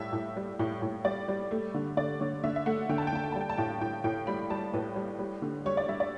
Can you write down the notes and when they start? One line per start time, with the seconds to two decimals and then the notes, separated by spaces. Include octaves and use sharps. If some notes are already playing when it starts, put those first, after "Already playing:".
Already playing: A2 G3 E5 A5
0.13 A2
0.37 G3
0.59 A2
0.82 A2
1.05 G3 D5
1.28 G3
1.51 A3
1.74 D3
1.97 D3 D5
2.20 D3 C#5
2.43 D3 E5
2.56 E5
2.66 A3 F#5
2.89 D3 G5
2.98 A5
3.07 G5
3.13 D3 A5
3.24 G5
3.32 G3 A5
3.41 G5
3.49 A5
3.57 A2 G5
3.81 A2 G5
4.04 A2 G5
4.27 G3 B5
4.50 G3 A5
4.73 A2 B4
4.96 G3
5.19 G3
5.42 D3
5.66 G3 C#5
5.77 D5
5.88 G3 E5
6.00 D5